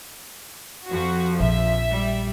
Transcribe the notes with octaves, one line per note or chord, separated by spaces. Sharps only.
F2 F3 F#4
A#1 E5
G3